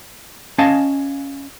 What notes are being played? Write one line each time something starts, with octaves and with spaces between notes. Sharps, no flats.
C#4 D#5 F5 G#5 A5